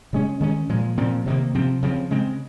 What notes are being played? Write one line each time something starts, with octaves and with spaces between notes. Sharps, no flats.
C#3 G#3 C#4
D#3 G#3 C#4
A#2 F3 G#3
A#2 F3 C4
C3 D#3 A#3
C3 F3 C4
C#3 F3 C4
C#3 G#3 C4